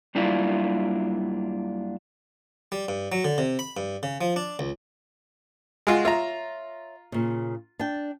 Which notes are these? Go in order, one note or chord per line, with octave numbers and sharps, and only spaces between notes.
F#2 G3 A#3 D4 E4 F4
G3
G2
F#3
D3
C3
B5
G2
C#3
F3
D4
C#2
G#3 F4 F#4
F4 C#5 E5 A#5
A#2 C#3
D4 G5